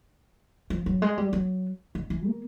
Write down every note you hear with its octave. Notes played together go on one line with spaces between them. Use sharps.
F3
F#3
G#3
G3
F#3
D#3
E3
A#3